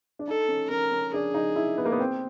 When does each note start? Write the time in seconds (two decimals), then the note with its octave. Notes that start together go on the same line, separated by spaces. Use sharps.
0.19 D4
0.27 D#4 A4
0.48 C#4
0.70 C#4 A#4
0.92 C#4
1.13 D4 G#4
1.34 D#4
1.56 E4
1.78 B3
1.86 A#3
1.92 B3
2.00 C4